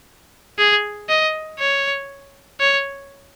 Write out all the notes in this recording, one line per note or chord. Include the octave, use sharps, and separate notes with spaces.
G#4
D#5
C#5
C#5